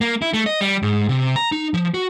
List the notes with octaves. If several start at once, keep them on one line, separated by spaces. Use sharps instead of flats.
A#3
E4
A3
D#5
G3
G#2
C3
A#5
D#4
F3
F#4